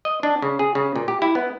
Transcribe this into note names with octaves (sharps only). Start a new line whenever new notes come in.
D#5
D4
C#3
G#4
C#3
A#2
G4
E4
B3